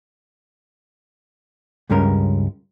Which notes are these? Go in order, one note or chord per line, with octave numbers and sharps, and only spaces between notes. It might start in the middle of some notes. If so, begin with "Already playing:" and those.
C#2 G2 G3 G#3 C#4 A#4